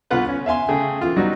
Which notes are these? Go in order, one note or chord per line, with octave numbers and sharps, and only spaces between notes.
C2 D3 B3 F4 B4 F#5
C#4
E5 F5 G#5 C6
C#3 A3 G#4 G5
E3 F4
F#3 G3 B3 D#4 F#4